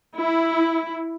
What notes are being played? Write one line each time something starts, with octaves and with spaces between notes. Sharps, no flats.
E4